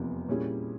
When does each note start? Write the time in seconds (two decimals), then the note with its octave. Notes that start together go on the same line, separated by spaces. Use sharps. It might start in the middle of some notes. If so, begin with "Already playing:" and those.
Already playing: F1 E2 C3 F3 A#3
0.28 A#2 G3 C#4 E4 G#4